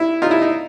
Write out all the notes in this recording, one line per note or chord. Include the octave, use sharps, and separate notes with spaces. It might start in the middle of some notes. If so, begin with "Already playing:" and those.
Already playing: E4
D#4 F4
E4
D#4